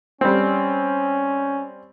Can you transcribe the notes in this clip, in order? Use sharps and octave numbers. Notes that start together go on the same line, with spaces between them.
G3 C4 C#4